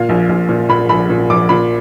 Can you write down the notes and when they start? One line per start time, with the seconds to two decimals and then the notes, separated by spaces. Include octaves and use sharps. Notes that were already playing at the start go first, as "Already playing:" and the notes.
Already playing: A#2 F5
0.09 A#1
0.29 A#1
0.49 A#2
0.69 A#2 B5
0.89 A#1 B5
1.10 A#2
1.30 A#1 D6
1.49 A#2 B5